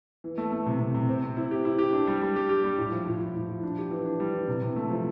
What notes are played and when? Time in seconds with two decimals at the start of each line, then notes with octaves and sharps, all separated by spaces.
0.24 E3
0.38 A3
0.52 A3
0.66 C3
0.80 C3
0.95 C3
1.09 C4
1.23 C4
1.37 E4
1.51 G4
1.65 E4
1.79 G4
1.93 D4
2.07 G3
2.22 G3
2.36 G4
2.49 G4
2.64 G3
2.78 A2
2.92 F3
3.06 A2
3.20 A2
3.35 A2
3.49 F3
3.63 D4
3.78 G4
3.91 E3
4.05 D4
4.20 G3
4.34 E3
4.48 C3
4.62 C3
4.76 A3
4.90 F3